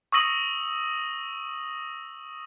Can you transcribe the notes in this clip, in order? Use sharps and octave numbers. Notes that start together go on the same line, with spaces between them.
C#6 D#6 E6 A#6 D#7 F#7